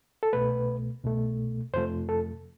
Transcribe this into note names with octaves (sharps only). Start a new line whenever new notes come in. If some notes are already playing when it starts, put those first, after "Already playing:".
A4
C2 B2 A3 B4
C2 B2 A3
F2 C3 F3 A3 C5
A4